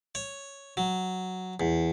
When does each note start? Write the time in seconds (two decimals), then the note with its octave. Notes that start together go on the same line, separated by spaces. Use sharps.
0.15 C#5
0.77 F#3
1.60 E2